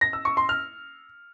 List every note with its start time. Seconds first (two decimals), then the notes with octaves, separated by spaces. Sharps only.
0.01 A#6
0.13 E6
0.25 C#6
0.37 C6
0.49 F6